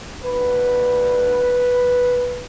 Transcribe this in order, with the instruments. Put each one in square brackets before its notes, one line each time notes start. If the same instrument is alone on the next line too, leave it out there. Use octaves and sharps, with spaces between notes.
[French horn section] D2 D3 B4